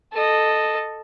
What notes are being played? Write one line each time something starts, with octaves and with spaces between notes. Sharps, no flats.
A4 D#5